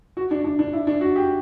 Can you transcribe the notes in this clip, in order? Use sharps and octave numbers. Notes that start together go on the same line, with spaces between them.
F#4
D4
D4
D4
E4
D4
F#4
G4